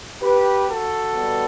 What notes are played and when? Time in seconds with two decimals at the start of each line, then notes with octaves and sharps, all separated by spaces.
0.22 G4 B4
0.68 F#4 A4
1.15 B2 G3 B3